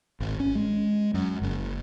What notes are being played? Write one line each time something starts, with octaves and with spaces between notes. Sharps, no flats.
G#1
C#4
G#3
F#2
F#1